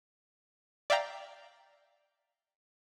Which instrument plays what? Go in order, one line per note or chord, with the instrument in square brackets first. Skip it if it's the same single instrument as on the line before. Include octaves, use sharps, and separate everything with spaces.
[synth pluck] D5 E5 F5 G5 A#5